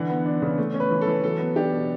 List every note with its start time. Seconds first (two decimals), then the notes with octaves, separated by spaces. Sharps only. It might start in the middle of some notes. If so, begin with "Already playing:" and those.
Already playing: D3 E3 F#5
0.10 B3
0.26 D4
0.42 C#3
0.58 A3
0.74 C#4
0.80 B4
0.91 E3
1.01 A4
1.07 E3
1.23 F#3 A4
1.39 B3
1.56 D4 G4
1.72 B2